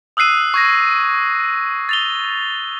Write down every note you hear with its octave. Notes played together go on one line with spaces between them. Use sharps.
D#6 E6 F#6 C7 D#7
C#6 G#6 A#6
A6 F7 G7